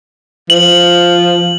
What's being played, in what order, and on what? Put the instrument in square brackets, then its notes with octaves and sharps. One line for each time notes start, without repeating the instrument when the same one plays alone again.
[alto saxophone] F3 [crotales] F#7